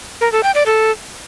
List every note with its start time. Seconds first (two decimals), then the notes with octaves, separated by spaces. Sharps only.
0.21 A#4
0.32 A4
0.43 G5
0.55 D5
0.66 A4